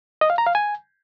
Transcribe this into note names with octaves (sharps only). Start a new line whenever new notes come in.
D#5
F5
A#5
F5
G#5